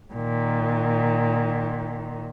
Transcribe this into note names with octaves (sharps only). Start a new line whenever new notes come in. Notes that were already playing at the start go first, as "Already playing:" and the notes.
A#2 D#3